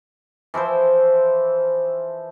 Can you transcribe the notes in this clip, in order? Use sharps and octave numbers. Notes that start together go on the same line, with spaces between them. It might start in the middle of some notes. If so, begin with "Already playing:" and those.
E3 F3 E4 C5